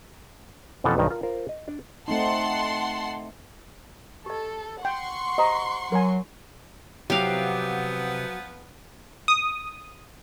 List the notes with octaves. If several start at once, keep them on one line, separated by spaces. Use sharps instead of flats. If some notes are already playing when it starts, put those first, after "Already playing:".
F2 B2 E3 F3 C#4 A4
B1 G2 D#3 D#5
F4 A#4
F4 A#4 C5
D#5
D4 D5
A3 C4 D#4 F#5 A5 C6
G4 A4 D#5
F#5 G5 C6 C#6
G4 C5 D#5 A#5
F#3 A#4 G#5
C3 F3 F#3 B3 C4 G4 F5
D#6